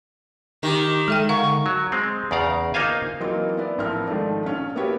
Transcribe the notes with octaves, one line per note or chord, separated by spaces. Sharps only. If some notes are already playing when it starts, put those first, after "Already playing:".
D#3 G4
G#3 A4 E5 G5
D3 F5 F#5 C#6
F#3
G#3 C4
E2 C#3 D5 F5 A#5
A#3 D#4 F4 C5 F5 G#5
E3 F#3 A#3 C4 D#4 F4
B3 E4 D5
A1 F3 C4 E4 A#4 F6
G#2 D#3 F3 A3 D4
A#1 C#4
A#3 B3 E4 F#4 G4 C#5